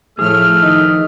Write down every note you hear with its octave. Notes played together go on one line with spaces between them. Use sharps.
A2 F3 A3 G#4 F6
D#3 D#5